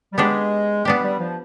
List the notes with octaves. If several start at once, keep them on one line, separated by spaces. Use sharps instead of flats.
G3
G#3 B3 D4 G4
G3 B3 D4 G4
G3
F3